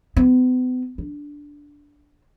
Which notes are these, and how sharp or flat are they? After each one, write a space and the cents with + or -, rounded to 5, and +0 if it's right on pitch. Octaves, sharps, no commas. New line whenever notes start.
B3 +40
D4 -5